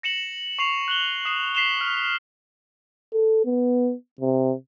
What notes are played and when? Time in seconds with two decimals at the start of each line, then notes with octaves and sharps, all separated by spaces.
0.03 A#6 C#7 E7 F#7
0.59 C#6 C7 F7
0.88 F#6 F#7 G7
1.25 D#6 C7 E7 F#7
1.55 B6 C7 E7 F7 G7
1.81 F6
3.13 A4
3.45 B3
4.21 C3